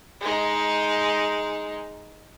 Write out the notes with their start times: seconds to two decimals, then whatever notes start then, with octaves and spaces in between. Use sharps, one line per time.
0.21 G#3 D#4